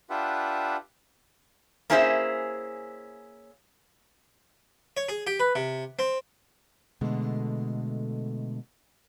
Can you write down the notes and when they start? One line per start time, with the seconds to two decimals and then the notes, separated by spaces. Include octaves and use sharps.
0.10 D4 F4 G4 B4 E5 F#5
1.90 A#3 C#4 E4 G#4 C5 E5
4.97 C#5
5.09 G#4
5.27 G4
5.40 B4
5.55 C3
5.99 C4
7.01 B2 D3 G#3 A3